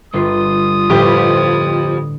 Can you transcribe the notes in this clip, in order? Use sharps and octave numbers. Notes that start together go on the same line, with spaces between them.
G1 F4 B4 D#6 C7
F2 A2 D3 G4 B4